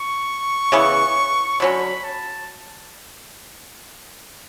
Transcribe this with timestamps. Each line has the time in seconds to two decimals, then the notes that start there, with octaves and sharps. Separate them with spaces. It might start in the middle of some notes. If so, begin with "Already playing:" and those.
Already playing: C#6
0.72 C#3 E3 B3
1.60 D3 F#3 C#4 B5
2.04 A5